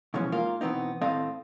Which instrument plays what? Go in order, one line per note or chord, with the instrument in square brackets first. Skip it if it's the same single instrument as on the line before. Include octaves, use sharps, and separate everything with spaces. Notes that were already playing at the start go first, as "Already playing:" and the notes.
[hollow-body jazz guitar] B2 E3 F3 G#3 C#4
G#2 A#3 F4 A#4 F5
B2 E3 B3 C4 D#4
D#2 A2 C4 A4 D#5 F5